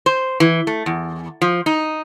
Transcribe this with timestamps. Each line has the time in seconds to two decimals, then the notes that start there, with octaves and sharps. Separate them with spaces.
0.06 C5
0.40 E3
0.67 A3
0.86 E2
1.42 F3
1.66 D#4